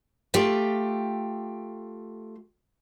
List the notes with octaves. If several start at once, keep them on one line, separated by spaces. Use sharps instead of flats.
A3 F4 G4 G5